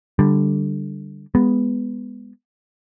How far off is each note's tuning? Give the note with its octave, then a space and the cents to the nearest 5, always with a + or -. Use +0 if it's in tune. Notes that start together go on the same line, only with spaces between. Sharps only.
D3 +0 G3 +0
G#3 -20 B3 +0